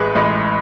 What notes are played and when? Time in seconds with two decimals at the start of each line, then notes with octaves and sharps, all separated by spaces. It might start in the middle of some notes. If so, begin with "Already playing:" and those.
Already playing: A1 A2 G#3 G#4 B4
0.15 A1 A2 G#3